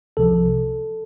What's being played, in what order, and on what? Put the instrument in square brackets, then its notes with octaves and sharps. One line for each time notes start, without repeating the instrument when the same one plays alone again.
[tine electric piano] C2 C3 F3 A4